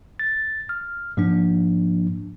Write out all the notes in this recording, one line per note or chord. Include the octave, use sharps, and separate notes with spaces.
A6
F6
G#2 F3 A#3 D4